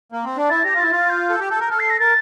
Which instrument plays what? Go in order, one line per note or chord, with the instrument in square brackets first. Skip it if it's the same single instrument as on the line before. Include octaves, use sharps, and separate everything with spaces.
[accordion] A#3
C4
D4
[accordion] E4 [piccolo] A6
[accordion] G4 [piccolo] A#6
[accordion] F4
[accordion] E4 [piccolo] A6
[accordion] F4
[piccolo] G6
[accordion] A4
G4
A4
A#4
[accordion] A4 [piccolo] F6
[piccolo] C7
A#6
[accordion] A#4 [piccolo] A6